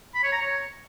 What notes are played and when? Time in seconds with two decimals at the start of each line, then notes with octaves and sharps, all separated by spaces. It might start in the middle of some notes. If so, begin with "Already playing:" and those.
0.15 B5
0.24 C#5
0.33 A#5
0.42 C#5